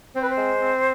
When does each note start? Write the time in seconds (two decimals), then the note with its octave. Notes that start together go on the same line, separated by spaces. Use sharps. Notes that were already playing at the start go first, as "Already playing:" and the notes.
0.14 C4 C5
0.22 B4
0.29 C5
0.36 G#3
0.59 C4